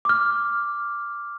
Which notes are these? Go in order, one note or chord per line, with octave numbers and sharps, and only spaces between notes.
D6 F6